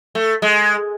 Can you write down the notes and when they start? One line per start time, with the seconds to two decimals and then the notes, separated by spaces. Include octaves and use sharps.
0.15 A3
0.42 G#3